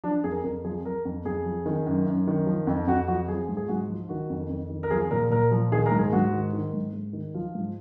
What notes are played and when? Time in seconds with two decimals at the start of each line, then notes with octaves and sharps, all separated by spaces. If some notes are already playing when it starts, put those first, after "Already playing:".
0.04 F3 D4
0.24 F2 G#4
0.31 A#4
0.44 F2 A#4
0.64 F3 G#4
0.85 F3 A#4
1.05 F2
1.25 F2 G#4
1.46 F3
1.66 D#3
1.86 F#2
2.06 F#2
2.27 D#3
2.47 F3
2.67 F2
2.87 F2 F#4
3.08 F3 F#4
3.28 F3 G#4
3.49 G#2
3.57 G#4
3.68 G#2 F#4
3.89 F3
4.09 D#3 F#4
4.30 F2
4.49 F2
4.70 D#3
4.83 A#4
4.90 F3 G#4
5.11 A#2 A#4
5.31 A#2 A#4
5.51 F3
5.72 D#3 G#4
5.86 A#4
5.91 G#2
5.98 G#4
6.13 G#2 F#4
6.33 D#3
6.53 D#3
6.73 G#2
6.93 G#2
7.13 D#3
7.34 F3 F4
7.55 G#2